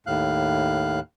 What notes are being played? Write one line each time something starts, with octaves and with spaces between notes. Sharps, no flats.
D#2 A2 F5 F#6